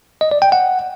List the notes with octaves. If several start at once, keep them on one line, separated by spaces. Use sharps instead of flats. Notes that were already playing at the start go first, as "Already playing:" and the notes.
D#5
D5
G5
F#5